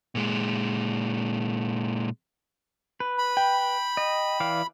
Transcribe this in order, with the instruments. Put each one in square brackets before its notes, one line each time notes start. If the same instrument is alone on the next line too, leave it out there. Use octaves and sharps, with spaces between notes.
[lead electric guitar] A#2 G#3
[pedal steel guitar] B4
[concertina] B5
[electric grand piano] G5
[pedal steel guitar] D#5
E3 D5 F5